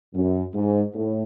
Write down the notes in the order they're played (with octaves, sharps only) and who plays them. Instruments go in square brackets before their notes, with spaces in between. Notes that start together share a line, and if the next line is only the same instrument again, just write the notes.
[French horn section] F#2
G#2
A2